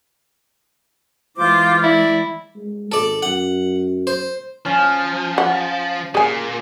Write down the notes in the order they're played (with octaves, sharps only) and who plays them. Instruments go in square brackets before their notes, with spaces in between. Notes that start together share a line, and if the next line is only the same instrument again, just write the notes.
[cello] E3 G#3 [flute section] F4 C5 D6
[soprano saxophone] E4 [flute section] D5
[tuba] G#3
[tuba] G#1 [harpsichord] A4 D5
[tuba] F#2 [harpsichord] F#5
[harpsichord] C5
[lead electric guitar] F3 [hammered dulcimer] C#4
[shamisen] F#5
[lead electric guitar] A#2 [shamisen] G#4 G#5